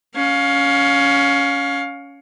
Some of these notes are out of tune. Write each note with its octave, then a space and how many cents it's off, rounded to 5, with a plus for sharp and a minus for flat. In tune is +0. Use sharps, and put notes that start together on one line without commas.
C#4 +15 F5 +20